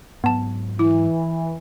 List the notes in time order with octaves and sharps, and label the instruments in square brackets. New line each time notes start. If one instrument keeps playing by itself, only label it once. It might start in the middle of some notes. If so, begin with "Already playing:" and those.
[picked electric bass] G#2 F#3 [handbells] B3 A5
[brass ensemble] E3 [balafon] E4